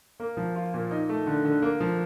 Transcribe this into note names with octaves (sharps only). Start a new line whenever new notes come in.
A#3
F3
F4
A#2
D#4
A3
D3
D3
A#3
F3